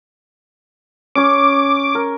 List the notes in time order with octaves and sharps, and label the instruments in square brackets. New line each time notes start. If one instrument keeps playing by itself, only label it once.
[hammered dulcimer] C#4 C#5 [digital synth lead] D6
[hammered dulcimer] A#4